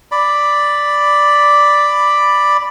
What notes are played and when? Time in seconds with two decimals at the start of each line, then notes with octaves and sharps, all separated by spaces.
0.12 D5 B5